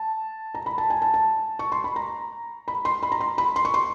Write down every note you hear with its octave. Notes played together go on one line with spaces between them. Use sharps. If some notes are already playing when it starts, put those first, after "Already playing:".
Already playing: A5
A#5
B5
A5
G#5
A5
A5
C#6
C6
B5
A#5
B5
C6
B5
A#5
C6
B5
C6
C#6
C6